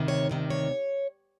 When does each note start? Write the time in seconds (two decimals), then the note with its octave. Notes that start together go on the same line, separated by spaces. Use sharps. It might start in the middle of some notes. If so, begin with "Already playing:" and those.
Already playing: D2 C3 D#3
0.08 C#5
0.29 D2 C3 D#3
0.50 C#5